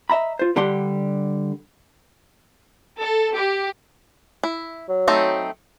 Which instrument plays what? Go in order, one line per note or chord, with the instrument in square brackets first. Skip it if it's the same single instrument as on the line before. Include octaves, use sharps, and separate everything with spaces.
[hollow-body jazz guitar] D#5 E5 A#5 B5
F4 C5
D3 G3 D4 G4 F#5 C6
[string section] A4
G4
[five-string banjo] E4
[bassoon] F#3
[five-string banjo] A3 C4 D#4